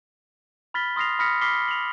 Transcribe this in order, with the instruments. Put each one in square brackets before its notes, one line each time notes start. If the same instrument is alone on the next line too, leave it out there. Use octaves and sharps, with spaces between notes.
[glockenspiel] B5 F6 A6 B6 G7
C6 D#6 F6 A#6 C7 F7
B5 D#6 F6 A#6 B6 C#7
B5 D6 F6 B6 C7 G7
F7 F#7